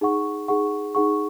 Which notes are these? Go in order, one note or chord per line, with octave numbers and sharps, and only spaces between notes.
D#4 G#4 F#5 C#6
D#4 G#4 F#5 C#6
D#4 G#4 F#5 C#6